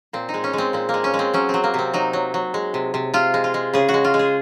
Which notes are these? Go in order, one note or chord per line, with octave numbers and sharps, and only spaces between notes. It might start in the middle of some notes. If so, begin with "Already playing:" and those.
A#2 C4
D#4
G#3
C#4
G#3 C4
A#2 C4
A#3
G#3
C#4
G#3
C4
F#3 C#4
F#3 C4
A#3
C3 C4
F#3 D#4
F#3
F#3
G#3
C3
C3
C3 F4
G#3
F4
G#3
C#3 G#4
F#4
G#3
F4
G#3
G#4